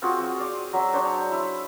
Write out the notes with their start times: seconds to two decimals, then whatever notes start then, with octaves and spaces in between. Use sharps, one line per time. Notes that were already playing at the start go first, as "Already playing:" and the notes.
0.02 C4 F4 F#4 G#4
0.19 C4 F#4
0.38 D5 F5
0.73 F#3 E5 E6
0.93 D4 C5 C#5
1.31 E4